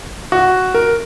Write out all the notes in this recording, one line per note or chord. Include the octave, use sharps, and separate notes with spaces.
F#4
A#4